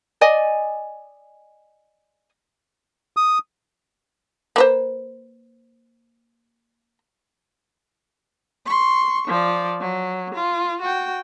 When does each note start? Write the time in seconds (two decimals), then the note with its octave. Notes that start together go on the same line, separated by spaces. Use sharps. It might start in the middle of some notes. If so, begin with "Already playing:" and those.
0.21 D5 D#5 G#5
3.17 D#6
4.56 A#3 B4 C5
8.66 C6 C#6
9.28 F3 D5
9.80 F#3
10.34 F4
10.81 F#4 G5